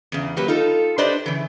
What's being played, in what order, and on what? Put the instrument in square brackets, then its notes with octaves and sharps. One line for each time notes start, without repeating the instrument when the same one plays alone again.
[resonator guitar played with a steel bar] E2 C#3
F#3 A#3 G4 B4
D#4 F4 A4
D4 G4 B4 C5 D5 D#5
C#3 E3